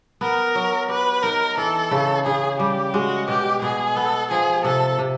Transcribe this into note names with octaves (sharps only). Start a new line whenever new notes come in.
B3 A#4
F#3
G4 B4
D#4 A#4
E3 A4
C#3
C#3 G#4
G3 G4
G#3 F#4
B2 G4
B2 G#4
B3 A4
F3 G#4
C3 A4
C3